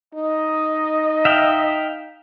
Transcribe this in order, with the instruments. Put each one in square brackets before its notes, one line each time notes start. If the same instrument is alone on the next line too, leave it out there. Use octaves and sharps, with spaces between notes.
[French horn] D#4 [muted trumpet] D#5
[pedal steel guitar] E5 F5 G5